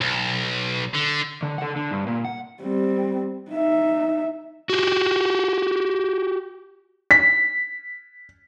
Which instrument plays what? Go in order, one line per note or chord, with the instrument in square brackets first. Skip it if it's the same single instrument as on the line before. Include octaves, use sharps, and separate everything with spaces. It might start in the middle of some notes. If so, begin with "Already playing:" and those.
[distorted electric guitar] B1
D3
[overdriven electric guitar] D3
A4 F#5
D3
G2
A#2
F#5
[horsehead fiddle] G3 C4
D#4 E5
[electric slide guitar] F#4 G4
[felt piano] B6